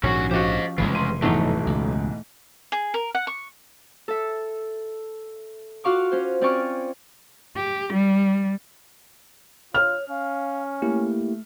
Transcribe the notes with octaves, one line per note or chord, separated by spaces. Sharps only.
A#1 D#2 G#2 C#4 F#4
F3 F#4 G4 C5 D#5
F1 C2 C#3 E3 G#3
C6 D#7
B1 E2 G#2 B2 A3 D#4
C#2
G#4
A#4
F#5
C#6
A4 E5
F4 F#4 F5 C#6 D6
C#4 C5
C4 C#4 D5 G#5 C#6 F6
G4
G3
F4 C#5 F6
C#4 F5
A3 A#3 E4 G4